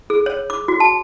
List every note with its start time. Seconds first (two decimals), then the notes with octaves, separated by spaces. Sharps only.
0.10 G#4
0.26 C#5
0.50 D6
0.68 F#4
0.80 A5